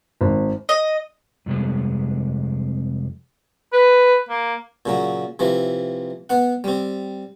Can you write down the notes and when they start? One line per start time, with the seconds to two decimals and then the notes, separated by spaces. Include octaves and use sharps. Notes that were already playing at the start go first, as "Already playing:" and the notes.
0.21 G#1
0.69 D#5
1.46 F2 C3 G3 G#3
3.73 B4
4.29 A#3
4.86 A#2 C#3 F#3
5.39 C3 E3 F3
6.30 B3 F#5
6.64 G3 C4